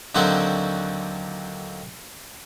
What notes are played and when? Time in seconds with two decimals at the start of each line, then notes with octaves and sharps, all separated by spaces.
0.15 D#2 D3 F#3 C4 F#4 D5